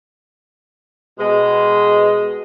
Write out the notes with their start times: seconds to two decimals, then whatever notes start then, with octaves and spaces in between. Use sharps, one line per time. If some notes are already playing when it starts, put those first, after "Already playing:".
1.19 B2 G#3